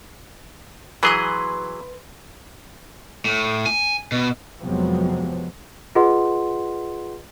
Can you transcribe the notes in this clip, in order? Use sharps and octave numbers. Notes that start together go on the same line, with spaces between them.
E3 F#3 G#4 B4 C6 D#6
A2
G#5
B2
F2 C3 F3 F#3 G#3 B3
F4 G#4 B4 D#5 F#5 C6